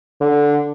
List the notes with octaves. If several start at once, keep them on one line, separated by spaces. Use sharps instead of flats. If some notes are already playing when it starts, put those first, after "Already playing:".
D3